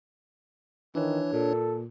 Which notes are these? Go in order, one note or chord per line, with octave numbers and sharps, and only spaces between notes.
D#3 E3 D4 C#5
A#2 A4